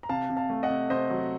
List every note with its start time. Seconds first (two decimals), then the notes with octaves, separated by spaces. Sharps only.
0.03 A#5
0.09 C3 F5 A5
0.30 C3
0.37 F5 A5
0.50 A3
0.63 D#5 F#5
0.70 C3
0.90 C3 C5 D#5
1.10 F#3